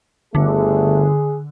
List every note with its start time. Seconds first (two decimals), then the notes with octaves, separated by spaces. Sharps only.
0.35 G1 D3 A3 G#4